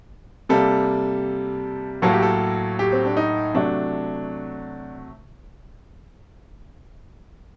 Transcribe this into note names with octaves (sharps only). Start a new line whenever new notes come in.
C3 G3 A#3 A4
A2 F#3 A#3 A4
G4
A4
G4
C4
D4
D#4
C3 F#3 A3 D4